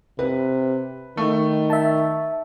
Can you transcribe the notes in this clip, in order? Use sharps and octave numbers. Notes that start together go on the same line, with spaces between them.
C3 B4
D#3 A3
E5 A5